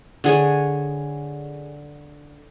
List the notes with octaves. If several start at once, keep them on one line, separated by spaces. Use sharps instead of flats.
D3 G#4 C#5